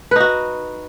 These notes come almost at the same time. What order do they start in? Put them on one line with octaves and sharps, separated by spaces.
B4 D#4 F#4